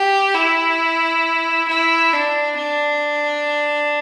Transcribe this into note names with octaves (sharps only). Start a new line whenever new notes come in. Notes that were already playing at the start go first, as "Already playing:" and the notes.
Already playing: G4
E4
E4
D4
D4